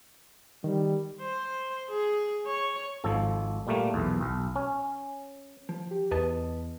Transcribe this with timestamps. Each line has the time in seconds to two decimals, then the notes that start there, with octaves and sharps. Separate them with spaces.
0.64 D#3 G3
1.21 C5
1.88 G#4
2.46 C#5
3.04 G#1 F3 A4
3.67 A#2 G3 A3 A#3
3.94 B1 E2
4.21 B1
4.56 C#4
5.69 F3
5.91 G4
6.11 E2 B4 D#5 A5